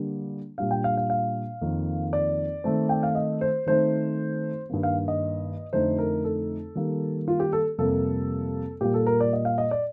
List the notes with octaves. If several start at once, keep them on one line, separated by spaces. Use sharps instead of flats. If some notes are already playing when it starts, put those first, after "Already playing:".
Already playing: D3 G3 A#3 D4
A#2 G3 D4 F5
G5
F5
F5
F5
F2 D#3 A#3 D#4
D5
D#3 A3 C4
G5
F5
D#5
C5
D#3 A3 C4 D#4 C5
G2 D#3 A#3
F5
D#5
F2 D3 A3 D#4 C5
A#4
A4
D#3 G3 A#3
F4
G4
A4
F2 C3 G3 A#3 A4
A#2 G3 A#3 G4
A4
A#4
D5
D#5
F5
D#5
D5